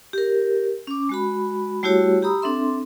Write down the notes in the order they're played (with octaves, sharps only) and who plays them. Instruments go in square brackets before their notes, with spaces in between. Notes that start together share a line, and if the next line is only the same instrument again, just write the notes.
[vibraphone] G4 A#4
C#4 D6
G#3 F#4 B5
G3 A3 E4 F#4 G4 C#5
G4 A#5 B5 D#6 E6
C4 D4 A4 E5 C6